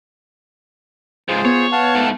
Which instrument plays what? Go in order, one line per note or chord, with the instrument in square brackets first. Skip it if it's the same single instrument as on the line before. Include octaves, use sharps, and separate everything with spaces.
[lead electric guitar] C#2 G#2 [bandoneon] F4 G#4 C5
[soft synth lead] B3 [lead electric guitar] C#5
[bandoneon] F5 F#5 A5
[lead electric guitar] G#2 A3